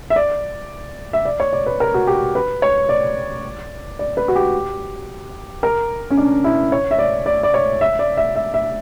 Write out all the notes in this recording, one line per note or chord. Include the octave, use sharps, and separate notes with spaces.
E5
D5
E5
D5
C#5
D5
B4
A#4
F#4
G4
B4
C#5
D5
D5
B4
F#4
G4
A#4
C#4
D4
E4
C#5
E5
D5
D5
D5
C#5
E5
D5
E5
E5
E5